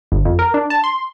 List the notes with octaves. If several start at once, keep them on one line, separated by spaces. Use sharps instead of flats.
G1
F2
A#4
D4
A5
C6